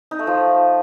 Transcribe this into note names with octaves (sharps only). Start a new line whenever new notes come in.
D#4
A3
F3